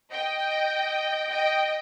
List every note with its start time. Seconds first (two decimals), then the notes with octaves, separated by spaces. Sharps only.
0.12 D#5 G5
1.29 D#5 G5